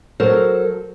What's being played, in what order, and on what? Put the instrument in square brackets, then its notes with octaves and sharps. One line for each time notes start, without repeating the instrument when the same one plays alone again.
[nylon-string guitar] F#3 A4 A#4 C5